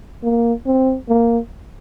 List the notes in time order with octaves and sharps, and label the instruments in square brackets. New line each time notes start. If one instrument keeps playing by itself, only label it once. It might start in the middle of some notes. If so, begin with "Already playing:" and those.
[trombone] A#3
C4
A#3